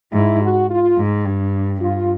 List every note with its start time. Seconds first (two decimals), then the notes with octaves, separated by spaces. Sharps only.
0.12 G#2 E4
0.41 F#4
0.69 F4
0.97 G#2
1.25 G2
1.81 G2 F4